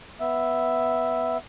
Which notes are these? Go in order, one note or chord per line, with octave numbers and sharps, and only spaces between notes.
B3 E5